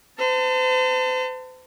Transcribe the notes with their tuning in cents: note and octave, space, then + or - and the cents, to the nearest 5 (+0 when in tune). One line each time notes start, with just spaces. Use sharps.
C5 -40 A5 +35